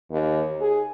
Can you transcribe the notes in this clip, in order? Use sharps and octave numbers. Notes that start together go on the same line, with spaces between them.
D#2
G#4